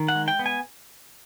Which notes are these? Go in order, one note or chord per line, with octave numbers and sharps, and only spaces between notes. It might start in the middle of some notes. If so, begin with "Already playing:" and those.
Already playing: D#3
F#5
G#3
G5
B3
G#5